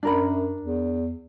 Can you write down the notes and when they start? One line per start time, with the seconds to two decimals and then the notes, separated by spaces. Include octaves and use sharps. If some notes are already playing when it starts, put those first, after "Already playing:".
0.03 F#2 D4 A#4 B5
0.62 E2